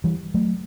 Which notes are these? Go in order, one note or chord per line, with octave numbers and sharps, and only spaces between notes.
E3 G3
F#3 A3